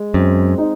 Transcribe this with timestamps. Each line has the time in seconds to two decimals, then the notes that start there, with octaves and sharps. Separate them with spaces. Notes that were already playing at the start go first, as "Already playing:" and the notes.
Already playing: G#3
0.14 F#2 C4
0.58 D#4